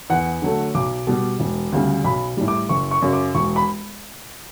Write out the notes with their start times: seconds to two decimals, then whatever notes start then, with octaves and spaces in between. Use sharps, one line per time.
0.10 E2 F#5
0.42 D3 F#3 A3
0.75 B1 D6
1.07 B2 G3
1.40 E1
1.72 D2 C#3 G3
2.04 B1 B5
2.37 A2 G3
2.48 D6
2.69 F#1 C#6
2.91 C#6
3.02 F#2 C#3
3.13 D6
3.35 E1 C#6
3.56 B5